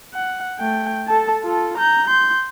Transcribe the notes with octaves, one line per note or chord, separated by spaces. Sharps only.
F#5
A3 G5
A4 A5
F4 A4
A#5 G6
C6 G6